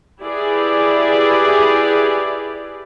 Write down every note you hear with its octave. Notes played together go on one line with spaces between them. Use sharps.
E4 G4 G#4 B4 D5